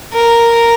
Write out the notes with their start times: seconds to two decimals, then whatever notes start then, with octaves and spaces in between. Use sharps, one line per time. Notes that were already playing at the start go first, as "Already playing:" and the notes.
0.13 A#4